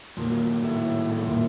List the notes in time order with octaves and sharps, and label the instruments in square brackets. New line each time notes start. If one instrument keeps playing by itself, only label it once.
[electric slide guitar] G2 D#3 F#3 [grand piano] A#2
[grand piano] A2
A2
A#2